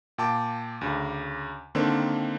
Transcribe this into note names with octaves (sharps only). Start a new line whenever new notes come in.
A#2 G5 A5 D6
D2 C#3
D3 D#3 A#3 C4 D4